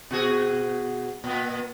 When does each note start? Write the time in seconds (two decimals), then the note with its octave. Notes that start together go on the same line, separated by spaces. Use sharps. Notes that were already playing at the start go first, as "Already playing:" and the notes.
0.11 B2 F#4 G#4
1.24 A#2 B3